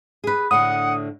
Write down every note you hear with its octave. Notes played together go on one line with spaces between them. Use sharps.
G#4 B4
A2 D3 F#5 D#6